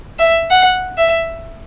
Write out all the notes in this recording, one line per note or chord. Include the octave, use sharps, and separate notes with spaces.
E5
F#5
E5